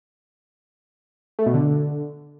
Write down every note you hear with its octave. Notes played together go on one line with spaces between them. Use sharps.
A3
B2
D3